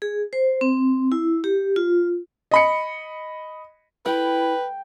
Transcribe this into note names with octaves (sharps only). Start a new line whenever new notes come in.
G#4
C5
C4
E4
G4
F4
D#5 B5 C#7
E4 B4 G5